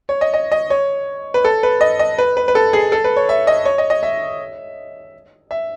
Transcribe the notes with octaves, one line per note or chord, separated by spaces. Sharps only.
C#5
D#5
D#5
D#5
C#5
B4
A4
B4
D#5
D#5
B4
B4
B4
A4
G#4
A4
B4
C#5
E5
D#5
C#5
D#5
D#5
E5
E5